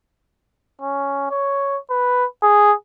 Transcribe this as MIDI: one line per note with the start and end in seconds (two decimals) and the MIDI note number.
0.81 1.29 61
1.31 1.78 73
1.90 2.25 71
2.42 2.73 68